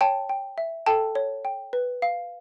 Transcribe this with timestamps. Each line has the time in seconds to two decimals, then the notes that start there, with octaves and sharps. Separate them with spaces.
0.01 C#5 G5 A5
0.29 G5
0.58 E5
0.86 A4 G5 A5
1.15 C#5
1.45 G5
1.73 B4
2.02 F5